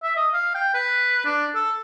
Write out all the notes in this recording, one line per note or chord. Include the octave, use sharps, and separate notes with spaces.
E5
D#5
F5
G5
B4
D4
A4